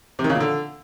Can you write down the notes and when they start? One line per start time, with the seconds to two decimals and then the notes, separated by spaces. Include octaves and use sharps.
0.19 C3
0.24 D#3
0.30 C#3
0.35 A#2
0.40 D3